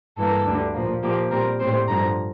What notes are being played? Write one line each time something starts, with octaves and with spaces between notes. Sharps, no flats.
G2 E3 A#3 A4
D2 D3 G3
A#2 F3 A#3
A#2 F3 A#3 G4
A#2 G3 C4 A#4
A2 G3 C4 C5
G2 D3 F3 A#5